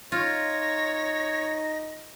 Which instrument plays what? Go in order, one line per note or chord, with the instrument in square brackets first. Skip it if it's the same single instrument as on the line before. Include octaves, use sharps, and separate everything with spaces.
[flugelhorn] D#4 [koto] F4 [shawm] C#5 [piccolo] A#6